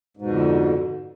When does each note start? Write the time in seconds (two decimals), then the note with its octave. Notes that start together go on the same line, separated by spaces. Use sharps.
0.17 G#2
0.22 B2
0.26 F2
0.30 D3